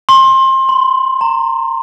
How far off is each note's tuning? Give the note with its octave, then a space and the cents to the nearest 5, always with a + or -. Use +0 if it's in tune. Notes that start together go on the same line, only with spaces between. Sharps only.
C6 +25
C6 -30
A#5 -20